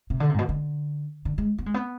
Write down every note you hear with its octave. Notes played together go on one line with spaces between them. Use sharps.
C3
D3
C3
G#2
B2
D3
D3
G#3
B3
G#3
B3